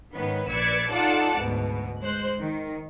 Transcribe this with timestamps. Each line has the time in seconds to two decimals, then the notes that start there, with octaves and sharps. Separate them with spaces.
0.15 G#2 D#3 B3 C#4 B4
0.49 A#1 B4 D5 E6 G#6 C#7
0.91 D#4 F4 A4 D5 F#5 A5
1.38 D2 G#2 B2
2.03 G#3 C5 F#6
2.39 D#3